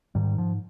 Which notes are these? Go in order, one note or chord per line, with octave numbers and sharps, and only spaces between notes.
G#2 D#3 G3
G#2 F3